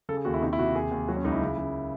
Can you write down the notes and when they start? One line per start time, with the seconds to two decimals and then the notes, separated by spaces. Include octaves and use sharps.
0.09 C#3 A4
0.17 G#4
0.25 D#2 F#4
0.34 E4
0.42 C3 D#4
0.53 E4
0.59 C3 F#4
0.75 D#2 G#4
0.91 D#2
1.08 F#3 F#4
1.17 C#4
1.24 C#2 D#4
1.32 E4
1.42 C#3
1.58 C#3